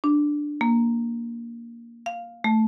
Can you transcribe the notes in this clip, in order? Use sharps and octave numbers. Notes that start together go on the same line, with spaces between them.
D4
A#3
F5
A3